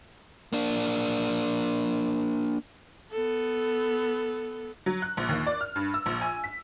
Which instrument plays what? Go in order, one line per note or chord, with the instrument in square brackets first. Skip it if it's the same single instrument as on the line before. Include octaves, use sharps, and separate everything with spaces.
[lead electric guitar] A#3 D4
[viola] B3 A4
[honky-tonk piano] F#3
F#6
A#1
D#2
D5
F6
G2
E6
A#1
G#5
B6